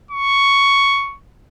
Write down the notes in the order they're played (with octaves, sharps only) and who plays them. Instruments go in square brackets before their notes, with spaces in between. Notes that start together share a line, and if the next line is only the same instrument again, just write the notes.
[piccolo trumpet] C#6